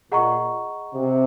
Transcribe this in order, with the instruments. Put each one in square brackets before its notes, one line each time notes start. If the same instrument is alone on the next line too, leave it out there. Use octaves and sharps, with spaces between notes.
[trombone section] A#2 [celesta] G#4 D#5 F#5 A#5 C#6
[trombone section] C3